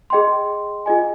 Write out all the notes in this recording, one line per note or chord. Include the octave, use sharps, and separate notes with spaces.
G#4 D#5 G5 C6
F4 G#4 D#5 G#5